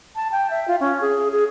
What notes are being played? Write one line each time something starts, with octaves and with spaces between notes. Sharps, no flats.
A5
G5
E5
F4
C#4
G#4
G#4